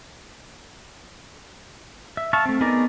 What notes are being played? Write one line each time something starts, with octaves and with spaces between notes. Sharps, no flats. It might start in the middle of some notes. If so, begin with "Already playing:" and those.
E5
E5 F5 A5 C#6
A3 C4
B3 D#4 G#4 A#4 D5